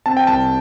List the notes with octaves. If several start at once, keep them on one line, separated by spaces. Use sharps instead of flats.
C4 A5
G5
C2 A5